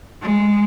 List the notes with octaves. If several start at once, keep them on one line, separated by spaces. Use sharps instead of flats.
G#3